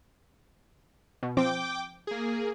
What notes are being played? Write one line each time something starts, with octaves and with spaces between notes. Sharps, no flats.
B2
F3 C4 G5 D6
A#3 G#4